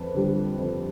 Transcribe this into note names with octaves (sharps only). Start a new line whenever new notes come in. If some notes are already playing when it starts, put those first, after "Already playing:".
Already playing: F2 B4
D3 G3
F2